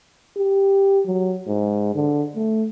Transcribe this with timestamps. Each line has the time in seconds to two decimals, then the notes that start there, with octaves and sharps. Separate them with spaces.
0.37 G4
1.06 F#3
1.47 G#2
1.95 D3
2.36 A3